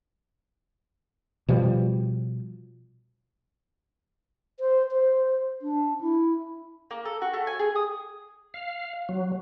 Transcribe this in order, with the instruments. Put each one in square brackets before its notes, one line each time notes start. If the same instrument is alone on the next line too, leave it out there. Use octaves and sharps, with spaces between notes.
[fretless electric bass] B2 F3 G3
[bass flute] C5
C5
D4
E4
[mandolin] A#3
A4
F#4
A3
G#5
G#4
D#6
[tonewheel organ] F5
F#3